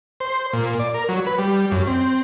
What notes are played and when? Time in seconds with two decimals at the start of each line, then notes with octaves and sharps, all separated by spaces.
0.20 C5
0.53 A#2
0.79 D5
0.94 A#4
1.09 F#3
1.26 B4
1.38 G3
1.71 F#2
1.87 C4